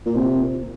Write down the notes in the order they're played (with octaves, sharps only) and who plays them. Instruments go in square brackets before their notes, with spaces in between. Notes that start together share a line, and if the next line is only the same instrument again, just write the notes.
[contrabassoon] A#2
C3